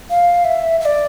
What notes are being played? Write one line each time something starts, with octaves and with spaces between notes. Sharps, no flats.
F5
E5
E5
D5